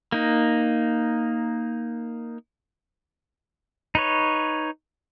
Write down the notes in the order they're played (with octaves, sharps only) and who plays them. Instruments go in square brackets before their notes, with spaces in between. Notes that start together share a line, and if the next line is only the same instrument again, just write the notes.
[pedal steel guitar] A#3 D#4
D#4 B4 C#5